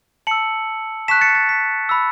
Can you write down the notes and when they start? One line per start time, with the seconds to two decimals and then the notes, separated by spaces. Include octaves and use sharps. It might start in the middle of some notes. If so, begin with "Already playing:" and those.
0.27 A5 E6 C#7 F#7
1.08 A5 C#6 F#6 B6 E7
1.21 A6 C#7
1.35 A6
1.49 B6
1.89 B5 E6